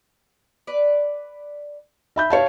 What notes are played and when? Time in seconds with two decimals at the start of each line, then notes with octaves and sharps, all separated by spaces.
0.67 B4 D5
2.16 E5 B5 G6
2.30 B2 G3 E4 C#5 F5 A5